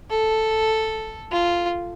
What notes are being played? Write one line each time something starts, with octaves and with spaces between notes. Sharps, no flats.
A4
F4